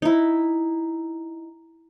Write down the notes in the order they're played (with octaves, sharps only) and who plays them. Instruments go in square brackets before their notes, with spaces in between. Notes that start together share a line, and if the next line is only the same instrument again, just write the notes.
[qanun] D#4 E4